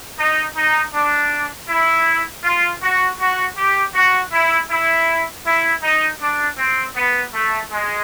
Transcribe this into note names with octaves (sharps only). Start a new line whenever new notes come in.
D#4
D#4
D4
E4
F4
F#4
F#4
G4
F#4
E4
E4
E4
D#4
D4
C4
B3
A3
G#3